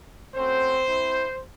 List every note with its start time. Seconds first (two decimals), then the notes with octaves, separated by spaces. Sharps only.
0.34 A3 C4 C#4 F#4 C5
0.85 C4 E4